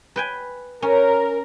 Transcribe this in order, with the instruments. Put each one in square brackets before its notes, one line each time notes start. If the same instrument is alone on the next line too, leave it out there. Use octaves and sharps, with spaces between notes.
[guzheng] B4 G5 G#5
[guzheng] C#4 [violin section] A#4